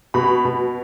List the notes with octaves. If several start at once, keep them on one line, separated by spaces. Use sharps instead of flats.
B2 B5
B2